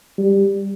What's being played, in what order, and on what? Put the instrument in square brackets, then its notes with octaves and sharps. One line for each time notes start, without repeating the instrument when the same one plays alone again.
[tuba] G3